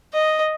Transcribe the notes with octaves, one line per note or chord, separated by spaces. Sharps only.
D#5